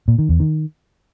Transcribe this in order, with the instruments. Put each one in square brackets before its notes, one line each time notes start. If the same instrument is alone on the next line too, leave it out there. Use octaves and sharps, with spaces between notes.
[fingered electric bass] A#2
D#3
E2
D#3